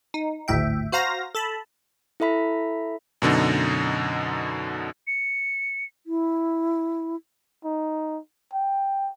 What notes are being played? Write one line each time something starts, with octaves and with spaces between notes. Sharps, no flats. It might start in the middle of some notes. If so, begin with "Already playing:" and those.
D#4
G#1 D2 A2 E5 G5
F#4 C5 F5 A#5 A#6
A4 A5 B5
E4 A4 E5 B5 B6
F#2 B2 D3 D#4
C#7
E4
D#4
G5